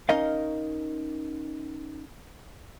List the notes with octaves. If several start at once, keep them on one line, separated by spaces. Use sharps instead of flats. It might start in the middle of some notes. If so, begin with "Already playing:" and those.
C#4 D#4 A#4 D#5 F5